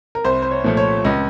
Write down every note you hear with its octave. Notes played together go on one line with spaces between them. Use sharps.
A#4
C2 C5
C5
C#5
A#2 F3 A3
C#5
C#2 D#5